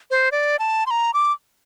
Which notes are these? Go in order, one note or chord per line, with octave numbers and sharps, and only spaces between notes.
C5
D5
A5
C6
A#5
D6